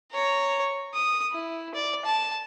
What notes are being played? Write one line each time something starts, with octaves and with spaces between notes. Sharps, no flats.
C#5 A#5
D#6
E4
D5
A5